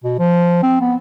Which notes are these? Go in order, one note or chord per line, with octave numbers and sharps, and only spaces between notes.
B2
F3
C4
B3